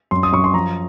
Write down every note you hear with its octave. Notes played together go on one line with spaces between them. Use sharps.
F#2 C6
D#6
F#2 C#6
C6
F3 A#5